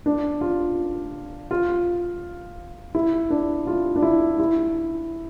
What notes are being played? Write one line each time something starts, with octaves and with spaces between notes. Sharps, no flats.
D4
F4
F4
E4
D4
F4
D4
E4
E4